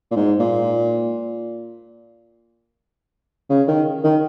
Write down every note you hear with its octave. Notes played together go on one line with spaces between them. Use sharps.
A#2
G#2
A#2
C#3
D#3
D#3